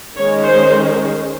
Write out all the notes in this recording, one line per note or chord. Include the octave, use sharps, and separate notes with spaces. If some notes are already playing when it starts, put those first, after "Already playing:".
D#3 G#3 C#4 C#5
C5